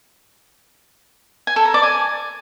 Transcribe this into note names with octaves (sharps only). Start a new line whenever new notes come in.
G#5
A4
A#5
D5
G#5